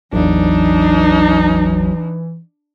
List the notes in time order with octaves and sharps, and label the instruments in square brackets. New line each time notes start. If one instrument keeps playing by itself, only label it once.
[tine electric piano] A1 E2 [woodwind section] E3 [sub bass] F#3 [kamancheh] D4 D#4